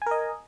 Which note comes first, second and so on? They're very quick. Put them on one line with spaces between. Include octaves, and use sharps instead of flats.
G#5 A#4 D#5